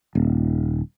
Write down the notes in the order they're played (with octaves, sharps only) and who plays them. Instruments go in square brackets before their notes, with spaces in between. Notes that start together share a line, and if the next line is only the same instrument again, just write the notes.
[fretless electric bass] D#1